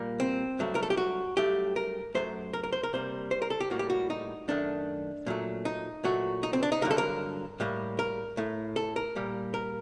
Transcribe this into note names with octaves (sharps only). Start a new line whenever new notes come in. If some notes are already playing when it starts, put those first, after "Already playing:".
Already playing: A#2 G3 A#3
C4
G2 F#3 A3
A#4
A4
G4
F#4
G2 F#3 A3 G4
A#4
F#2 D#3 F#3 A3 C5
A#4
A#4
C5
A#4
C3 G3 A#3 C5
C5
A#4
A4
G4
A2 G3 A#3 F#4
G4
F#4
D#4
F#2 D#3 A3 D4
A#2 F#3 A3
D#4
A#2 F#3 A3 F#4
D#4
C4
D4
D#4
G2 D3 F#3 A#3 A#4
A4
A#4
A2 G3 A#3
A#4
A2 A3
A4
A#4
A#2 G3 A#3
A#4